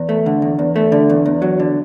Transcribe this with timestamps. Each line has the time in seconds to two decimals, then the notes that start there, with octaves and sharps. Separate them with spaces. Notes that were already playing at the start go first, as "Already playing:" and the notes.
Already playing: E2
0.09 A3
0.26 D3
0.42 E2
0.59 E2
0.76 A3
0.92 D3
1.09 E2
1.26 E2
1.42 F#3
1.60 D3